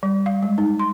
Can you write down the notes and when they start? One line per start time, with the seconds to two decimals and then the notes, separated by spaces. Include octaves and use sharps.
0.03 G3
0.26 F5
0.43 G#3
0.58 D#4
0.79 C6